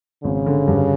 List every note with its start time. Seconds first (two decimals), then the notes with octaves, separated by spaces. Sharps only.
0.24 G#1 C#3
0.46 D3
0.68 G2